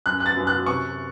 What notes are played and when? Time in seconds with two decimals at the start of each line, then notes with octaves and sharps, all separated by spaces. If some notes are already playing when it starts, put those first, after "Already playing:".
0.06 F#2 F#6
0.20 F#6
0.26 A6
0.36 F#2
0.47 F#6
0.66 C3 C#6